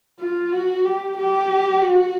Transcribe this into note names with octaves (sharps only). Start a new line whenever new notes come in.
F4
F#4
G4
G4
F#4